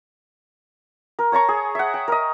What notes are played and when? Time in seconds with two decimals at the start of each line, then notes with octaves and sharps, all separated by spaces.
1.19 A#4
1.32 C#5 A5 A#5 C#6
1.49 G#4
1.75 E5 F#5
1.94 G5
2.08 A#4 D#5